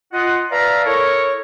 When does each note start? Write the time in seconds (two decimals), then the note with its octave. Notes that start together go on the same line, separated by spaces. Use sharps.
0.13 F4 D#5 F#5
0.51 B4 D5 E5 F5 A5 A#5
0.85 E4 A4 A#4 C#5